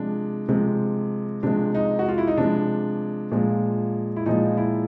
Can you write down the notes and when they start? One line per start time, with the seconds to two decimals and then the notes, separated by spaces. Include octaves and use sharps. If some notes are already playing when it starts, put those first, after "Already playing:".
Already playing: C3 F3 G#3 D4
0.48 C3 F3 G#3
1.43 C3 F3 G#3 D4
1.75 D#4
1.99 F#4
2.08 F4
2.18 E4
2.27 D#4
2.37 C3 F3 G#3 D4
3.31 A#2 F3 G#3
4.16 E4
4.26 A#2 F3 G#3 D#4
4.57 E4